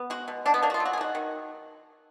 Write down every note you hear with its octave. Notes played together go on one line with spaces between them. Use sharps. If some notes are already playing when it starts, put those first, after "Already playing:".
Already playing: B3
G#3 F#4
B2
B2 D4
B3
A#3 D4
F#4
F4
F#3
F#4
G#4
D#3 F#4
D#3